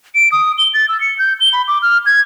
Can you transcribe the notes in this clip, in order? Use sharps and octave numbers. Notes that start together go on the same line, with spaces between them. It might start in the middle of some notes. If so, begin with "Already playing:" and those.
D7
D#6
G7
A6
E6
C#7
G6
G7
B5
D6
F6
G#6